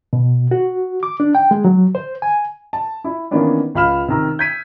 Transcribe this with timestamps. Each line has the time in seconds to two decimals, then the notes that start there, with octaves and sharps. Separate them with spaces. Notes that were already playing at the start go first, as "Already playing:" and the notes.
0.13 B2
0.51 F#4
1.03 D6
1.20 D4
1.35 G5
1.51 G#3
1.65 F#3
1.95 C5
2.22 G#5
2.73 A5
3.04 E4
3.31 D#3 E3 A#3 B3 C#4 D4
3.75 C#2 F5 B5 F6 E7
4.08 C3 D#3 A#5 E6
4.39 G6 G#6 B6 D#7